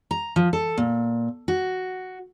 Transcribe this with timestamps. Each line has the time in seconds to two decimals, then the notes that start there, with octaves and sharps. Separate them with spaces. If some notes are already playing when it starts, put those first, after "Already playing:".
0.11 A#5
0.36 F3
0.53 A4
0.78 A#2
1.48 F#4